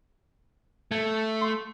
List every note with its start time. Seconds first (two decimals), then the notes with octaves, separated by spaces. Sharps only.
0.91 A3 G#6
1.41 C6